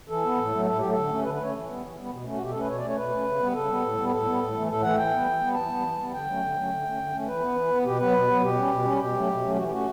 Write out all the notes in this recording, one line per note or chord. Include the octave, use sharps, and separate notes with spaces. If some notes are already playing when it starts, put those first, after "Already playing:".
E3 A4
B3
A2
F#3 A3
A2 A4
F#3 A3 G4
A4
D3
A3 C#4
D3 B4
B4
A3 C#4 C#5
E3
G3 B3
E3
G3 B3
B2
A3 C#4
F#4
B2 G4
A3 C#4 A4
B4
B2 C#5
D5
A3 C#4 C#5
B2 B4
A3 C#4
C#3
G3 B3
C#3 A4
G3 B3
A2
G3 B3
A2 A4
G3 B3
A2
E3 A3
A2 A4
E3 A3 F#5
E3 G5
G3 B3
E3
G3 B3
E3 A5
G3 B3
E3
G3 B3
D3 G5
F#3 A3 C#4
D3
F#3 A3 C#4
D3
A3 C#4
D3
A3 C#4
E3 B4
B3
E3
B3
B2 G4
F#3 B3 B4
B2
F#3 B3
B2 G4
G3 C#4
B2
G3 C#4
B2 G4
F#3 A3 C#4
B2
F#3 A3 C#4
E3 F#4
G4
A3 C#4 F#4